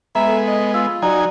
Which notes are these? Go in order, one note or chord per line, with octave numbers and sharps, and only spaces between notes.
G#3 B3 E5 A#5 B5
A4
D#5
F4 E6
F#3 D#4 F#4 D5 G#5 A#5